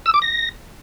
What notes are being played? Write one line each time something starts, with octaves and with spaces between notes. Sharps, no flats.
E6
D6
A#6